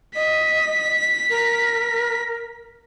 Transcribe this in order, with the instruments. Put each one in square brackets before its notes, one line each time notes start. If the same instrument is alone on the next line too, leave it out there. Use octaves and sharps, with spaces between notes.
[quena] D#5 [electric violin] B6
[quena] A#4